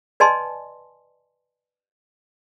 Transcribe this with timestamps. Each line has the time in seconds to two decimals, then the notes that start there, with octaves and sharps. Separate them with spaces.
0.20 B4 D5 D#5 G#5 A5 C6